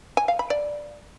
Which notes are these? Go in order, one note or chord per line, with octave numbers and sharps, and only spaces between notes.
G#5
F5
B5
D5